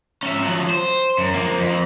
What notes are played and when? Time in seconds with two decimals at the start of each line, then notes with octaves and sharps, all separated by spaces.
0.23 C#4 E5
0.44 F3 F#3
0.70 C5
1.18 F#2
1.34 F3 A#3
1.58 F2